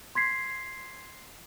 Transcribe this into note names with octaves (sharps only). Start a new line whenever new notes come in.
C6 G#6 B6 C7